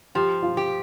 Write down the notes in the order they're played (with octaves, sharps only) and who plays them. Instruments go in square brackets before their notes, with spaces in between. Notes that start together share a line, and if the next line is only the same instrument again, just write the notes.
[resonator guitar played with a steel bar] F3 [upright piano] G4
[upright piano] F4
[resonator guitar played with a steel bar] G4